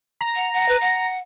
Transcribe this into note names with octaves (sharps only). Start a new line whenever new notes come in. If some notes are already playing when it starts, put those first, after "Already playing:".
A#5
F#5
F#5
B4
F#5